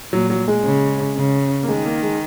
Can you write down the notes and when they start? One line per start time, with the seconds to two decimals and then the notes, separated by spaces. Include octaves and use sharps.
0.13 A#2 F#3
0.30 F#3
0.48 G#3
0.65 C#3
1.17 C#3
1.63 A#3
1.68 D#3 G#3
1.86 A#3
2.03 G#3